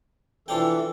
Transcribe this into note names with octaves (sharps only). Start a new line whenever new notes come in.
E3 F3 D4 A4 G5